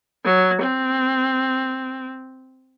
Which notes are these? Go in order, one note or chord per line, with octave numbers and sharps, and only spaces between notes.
F#3
C4